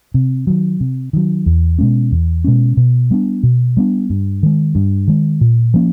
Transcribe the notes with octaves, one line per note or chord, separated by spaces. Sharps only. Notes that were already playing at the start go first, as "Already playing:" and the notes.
C3
D#3 F#3
C3
D#3 F#3
E2
B2 G#3 C#4
E2
B2 G#3 C#4
B2
G3 B3 D4
B2
G3 B3 D4
G2
D#3 G#3
G2
D#3 G#3
A#2
F3 A#3 C#4